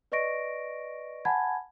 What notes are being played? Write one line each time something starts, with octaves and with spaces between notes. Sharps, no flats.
B4 D5 D#5 C#6 A#6 D7
F#5 G#5 A5 B5 G#6